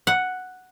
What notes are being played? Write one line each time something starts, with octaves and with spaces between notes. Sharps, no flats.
F#5